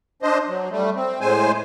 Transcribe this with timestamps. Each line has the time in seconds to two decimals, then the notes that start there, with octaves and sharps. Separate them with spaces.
0.23 D4 C5 D#5
0.48 F#3
0.70 G3 A3
0.95 C4
1.20 A2 G#3 C5 G#5